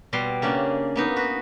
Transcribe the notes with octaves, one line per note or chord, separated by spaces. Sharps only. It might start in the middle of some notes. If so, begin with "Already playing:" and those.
B2 G3 C6
C#3 A#3 C#4 D4
A#3 B3 D#4
F#4 B4